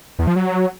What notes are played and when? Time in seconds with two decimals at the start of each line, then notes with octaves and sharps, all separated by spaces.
0.19 E2
0.27 F3
0.36 F#3